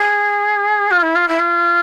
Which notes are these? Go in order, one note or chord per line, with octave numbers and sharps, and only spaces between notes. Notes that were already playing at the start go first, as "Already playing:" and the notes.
Already playing: G#4
F4
E4
F4
E4
F4